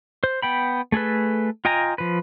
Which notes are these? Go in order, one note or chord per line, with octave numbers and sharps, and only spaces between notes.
C5
B3 G5 B5
A3 G#4 A4 B4
F4 D#5 G5 G#5 A#5
F3 B4